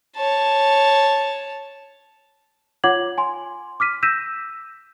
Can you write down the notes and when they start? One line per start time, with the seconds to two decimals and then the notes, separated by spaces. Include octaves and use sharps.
0.17 C#5 A5
2.84 F4 C#5 F#5 D6 G#6 F#7
3.18 G#5 C6
3.80 D6 F6 B6 D#7
4.03 E6 G6 A#6 B6 D#7 E7